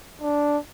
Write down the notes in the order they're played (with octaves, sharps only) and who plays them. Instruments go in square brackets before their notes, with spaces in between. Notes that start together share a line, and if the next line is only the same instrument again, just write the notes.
[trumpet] D4